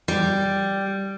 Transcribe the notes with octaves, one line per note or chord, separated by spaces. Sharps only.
G3